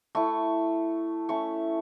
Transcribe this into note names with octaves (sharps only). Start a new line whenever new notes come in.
A3 E4 C#6
A3 C#4 E4 C#6